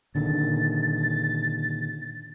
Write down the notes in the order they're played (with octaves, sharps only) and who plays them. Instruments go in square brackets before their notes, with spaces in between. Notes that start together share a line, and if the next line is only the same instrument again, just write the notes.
[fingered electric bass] A#2 D3 D#3 [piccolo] A6